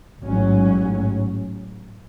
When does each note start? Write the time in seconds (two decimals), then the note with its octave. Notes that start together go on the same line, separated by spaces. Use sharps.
0.22 A1 G#2 F#3 C#4